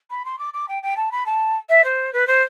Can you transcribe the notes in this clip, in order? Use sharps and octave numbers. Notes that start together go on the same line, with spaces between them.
B5
C6
D6
D6
G5
G5
A5
B5
A5
E5
C5
B4
C5